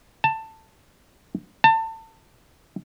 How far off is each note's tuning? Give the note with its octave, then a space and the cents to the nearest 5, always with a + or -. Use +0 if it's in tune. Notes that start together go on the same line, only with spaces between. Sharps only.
A5 +15
A5 +30